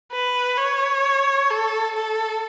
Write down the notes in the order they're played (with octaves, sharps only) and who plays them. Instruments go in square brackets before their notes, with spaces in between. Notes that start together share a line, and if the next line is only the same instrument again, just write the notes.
[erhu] B4
C#5
A4
A4